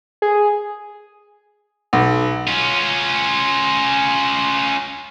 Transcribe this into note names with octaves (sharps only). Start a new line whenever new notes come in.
G#4
B1
C#4 F4